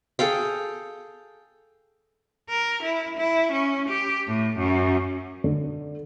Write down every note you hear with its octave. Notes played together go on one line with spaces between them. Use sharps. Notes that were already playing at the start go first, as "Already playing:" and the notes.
G#4 A4 F5 G5
A#4
E4
E4
C#4
G4
A2
F#2
D3